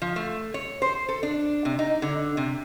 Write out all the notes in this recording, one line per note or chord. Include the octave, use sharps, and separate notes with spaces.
F3
A3
C#5
C5
A4
D4
C3
D#4
D3
C3